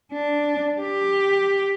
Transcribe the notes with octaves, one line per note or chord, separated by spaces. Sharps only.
D4
G4